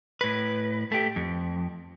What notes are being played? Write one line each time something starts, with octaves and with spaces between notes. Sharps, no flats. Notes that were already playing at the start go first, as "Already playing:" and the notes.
A2 B4
A3 G4
F2